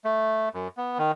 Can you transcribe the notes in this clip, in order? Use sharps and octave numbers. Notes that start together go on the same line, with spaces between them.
A3
F#2
B3
D#3